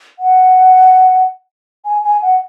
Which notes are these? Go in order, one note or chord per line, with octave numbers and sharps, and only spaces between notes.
F#5
G#5
G#5
F#5